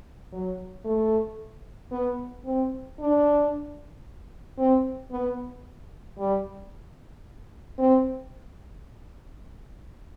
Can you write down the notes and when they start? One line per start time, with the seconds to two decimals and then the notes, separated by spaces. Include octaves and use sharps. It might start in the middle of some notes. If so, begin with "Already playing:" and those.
0.32 F#3
0.85 A3
1.92 B3
2.45 C4
2.99 D4
4.58 C4
5.12 B3
6.18 G3
7.78 C4